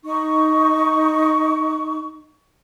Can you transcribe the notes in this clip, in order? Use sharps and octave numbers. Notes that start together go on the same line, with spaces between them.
D#4 C#6